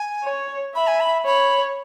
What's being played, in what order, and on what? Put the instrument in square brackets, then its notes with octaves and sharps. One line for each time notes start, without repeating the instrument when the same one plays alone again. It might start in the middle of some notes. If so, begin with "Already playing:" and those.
Already playing: [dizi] G#5
[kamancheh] C#5
[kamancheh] E5 [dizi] B5
[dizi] G#5
B5
[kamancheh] C#5 [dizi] B5